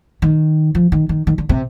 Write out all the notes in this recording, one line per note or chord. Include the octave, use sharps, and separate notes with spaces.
D#3
F3
D#3
D#3
D#3
D3
C3